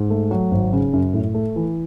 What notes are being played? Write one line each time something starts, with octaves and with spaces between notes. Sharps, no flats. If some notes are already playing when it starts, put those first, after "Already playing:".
Already playing: G#2
A3
F#3
G#1
C#3
F#2
A2
A3
E3